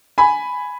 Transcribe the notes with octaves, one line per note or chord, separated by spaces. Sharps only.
G#5 B5